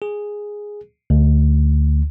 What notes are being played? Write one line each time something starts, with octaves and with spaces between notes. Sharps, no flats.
G#4
D2